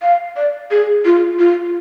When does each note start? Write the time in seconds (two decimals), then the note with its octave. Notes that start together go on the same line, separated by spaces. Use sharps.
0.02 F5
0.36 D5
0.71 G#4
1.05 F4
1.39 F4